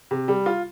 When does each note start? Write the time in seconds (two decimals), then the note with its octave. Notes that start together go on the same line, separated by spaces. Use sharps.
0.11 C3
0.28 G3
0.46 F4